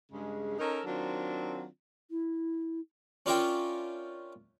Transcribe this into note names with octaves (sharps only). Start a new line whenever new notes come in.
G2 C#3 G#3
C#4 D#4 A4 A#4
D#3 F#3 C4 D4 F4
E4
C#4 D4 F4 A#4 E5 G5